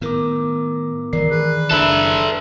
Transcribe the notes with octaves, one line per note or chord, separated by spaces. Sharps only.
A2 D#3 B3 A#4 D6
D#3 E3 G#3 A#4 D5 C7
G#4 B4 D5
F#1 D#3 D4 A4 B4 E5